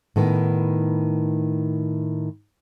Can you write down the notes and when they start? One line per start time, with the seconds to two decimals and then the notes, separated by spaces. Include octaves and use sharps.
0.16 A2 D#3 B3